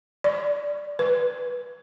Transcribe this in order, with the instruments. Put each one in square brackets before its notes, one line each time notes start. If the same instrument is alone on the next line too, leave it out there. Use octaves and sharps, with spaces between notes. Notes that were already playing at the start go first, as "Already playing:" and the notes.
[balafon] D5
B4